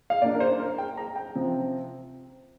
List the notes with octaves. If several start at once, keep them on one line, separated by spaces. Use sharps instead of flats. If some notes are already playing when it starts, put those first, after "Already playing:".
F5
A#2 A#3 D4 D5
A#4
C5
A#4
G5
A#5
G5
C3 F3 C4